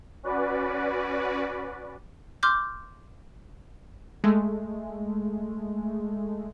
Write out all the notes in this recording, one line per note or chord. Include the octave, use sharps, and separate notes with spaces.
C#4 F#4 B4 D5
C6 D6 F6 G6
G#3 A3